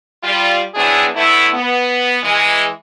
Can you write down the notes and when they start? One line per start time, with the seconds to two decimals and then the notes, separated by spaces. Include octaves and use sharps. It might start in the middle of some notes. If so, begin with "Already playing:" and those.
0.22 G3 F4
0.74 F#3 B3 C4 D4 E4 G#4
1.14 D3 A3 B3 E4
1.53 B3
2.21 E3 G#3